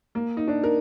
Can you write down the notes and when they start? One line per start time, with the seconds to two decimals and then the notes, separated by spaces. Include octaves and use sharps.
0.15 A#3
0.37 D#4
0.48 D4
0.63 A#4